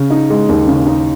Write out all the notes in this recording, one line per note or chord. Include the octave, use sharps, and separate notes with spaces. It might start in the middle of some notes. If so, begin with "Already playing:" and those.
Already playing: C#3
D#4
G#3
D#2
C#3
D#4